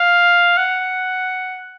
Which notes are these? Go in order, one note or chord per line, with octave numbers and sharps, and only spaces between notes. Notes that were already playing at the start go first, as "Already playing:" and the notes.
Already playing: F5
F#5